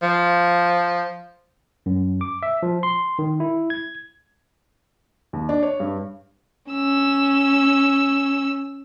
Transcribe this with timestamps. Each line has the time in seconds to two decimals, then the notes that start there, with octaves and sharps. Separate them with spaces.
0.03 F3
1.86 F#2
2.21 D6
2.43 E5
2.63 F3
2.83 C6
3.19 D#3
3.40 E4
3.70 G#6
5.33 D#2
5.49 D4
5.63 C#5
5.80 G2
6.71 C#4 E6